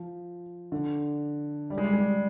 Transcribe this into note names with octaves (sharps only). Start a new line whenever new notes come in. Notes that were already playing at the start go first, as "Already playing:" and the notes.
Already playing: F3
D3
G3
G#3
G3
G#3
G3